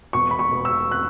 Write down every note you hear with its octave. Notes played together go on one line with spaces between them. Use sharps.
E1 C#6
B5
C#6
E1
E6
F#6